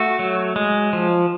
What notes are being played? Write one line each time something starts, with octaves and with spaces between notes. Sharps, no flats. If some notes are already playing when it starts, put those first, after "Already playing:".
Already playing: A3 F#4
F#3
G#3
F3